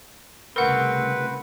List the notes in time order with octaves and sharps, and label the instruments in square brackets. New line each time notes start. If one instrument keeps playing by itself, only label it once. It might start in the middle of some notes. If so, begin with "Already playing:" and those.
[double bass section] C2 C#3 A3 [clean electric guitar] C4 F#4 [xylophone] A#4 F#5 [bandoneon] B4